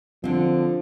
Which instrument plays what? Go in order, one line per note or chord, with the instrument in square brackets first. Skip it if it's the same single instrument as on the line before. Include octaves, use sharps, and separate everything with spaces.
[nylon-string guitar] D3 C4 [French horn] F3